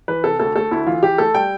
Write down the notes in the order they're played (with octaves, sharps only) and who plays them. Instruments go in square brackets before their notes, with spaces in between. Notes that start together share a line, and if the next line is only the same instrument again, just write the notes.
[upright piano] E3 B4
C3 A4
D2 A4
A3 A4
D2 E4
E3 F4
E3 G4
A3 A4
G3 G5